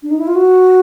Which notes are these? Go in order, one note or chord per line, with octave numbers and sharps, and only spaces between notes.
D4
D#4
E4
F4
F#4